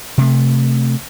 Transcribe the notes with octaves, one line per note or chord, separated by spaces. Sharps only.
C3 A3